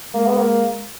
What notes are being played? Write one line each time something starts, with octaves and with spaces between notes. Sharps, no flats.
G#3 A#3
B3
A#3